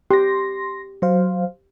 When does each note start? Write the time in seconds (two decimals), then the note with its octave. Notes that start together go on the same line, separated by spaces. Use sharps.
0.11 G4 C6 A#6
1.02 F#3 C5 F5